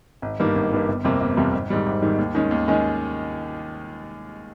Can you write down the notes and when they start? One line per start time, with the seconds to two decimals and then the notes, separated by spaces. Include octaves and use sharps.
0.22 G#1
0.40 G2 D#3 G3 A#3
0.56 G#1
0.72 G2 D#3 G3 A#3
0.88 G1
1.04 F2 C3 G3 A#3
1.21 G1
1.36 F2 C3 G3 A#3
1.53 G#1
1.70 G#2 D#3 G3
1.86 G#1
2.02 G#2 D#3 G3
2.18 D#2
2.35 D#3 G#3 C#4
2.51 D#2
2.68 D#3 G#3 C#4